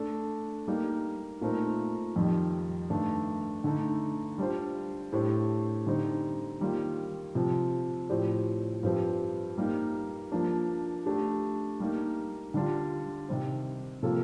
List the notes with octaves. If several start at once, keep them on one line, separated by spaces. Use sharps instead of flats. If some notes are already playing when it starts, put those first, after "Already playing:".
Already playing: A3 D4 A4
G3 A#3 D#4 G4
A#2 A3 C4 D#4 A#4
F2 D#3 G3
G2 D#3 A3 D4
D3 A3 D#4
G3 D4 F4 C5
A2 A3 D4 G4 C5
D3 G3 C4 D#4
D#3 G3 A#3 F4
C3 F3 C4
A2 F3 C4 G4 D5
G2 F3 C4 G4
G3 A#3 D#4
F3 A#3 D4
A3 D4 G4
G3 A#3 D#4
D3 G3 D4 F4
C3 D#3 G3 C4
C3 F3 A#3 F4 A4